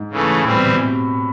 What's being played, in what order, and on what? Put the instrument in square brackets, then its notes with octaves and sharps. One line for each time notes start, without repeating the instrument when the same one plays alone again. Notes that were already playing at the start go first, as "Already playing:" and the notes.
Already playing: [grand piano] G#2
[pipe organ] C#3 E3 A3
[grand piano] A2 [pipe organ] E3 G3 C4
[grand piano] B2
C3